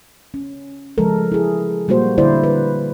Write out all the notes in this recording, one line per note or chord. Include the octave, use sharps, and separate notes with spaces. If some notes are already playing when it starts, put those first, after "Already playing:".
C#4
C#3 F3 G#3 A4 A#4
E4 G#4
A#2 G3 A#3 F#4 C5
D3 E4 C5 D5
B4